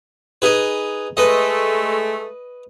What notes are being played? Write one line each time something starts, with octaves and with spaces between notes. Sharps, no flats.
D#4 G#4 B4
G#3 A3 B4 D#5